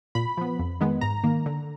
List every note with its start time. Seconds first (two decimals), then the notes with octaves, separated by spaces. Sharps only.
0.15 A#2 B5
0.37 F3 B3
0.59 F2
0.81 D#3 G#3 B3
1.01 G#2 A#5
1.24 D#3 A#3
1.46 D3